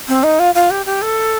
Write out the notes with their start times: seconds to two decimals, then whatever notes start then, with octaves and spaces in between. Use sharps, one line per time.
0.08 C4
0.23 D#4
0.39 F4
0.55 F4
0.71 G4
0.86 G4
1.02 A4